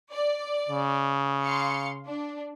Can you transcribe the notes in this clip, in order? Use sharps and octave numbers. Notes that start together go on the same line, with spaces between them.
D5
C#3
F5 C6 C#7
D4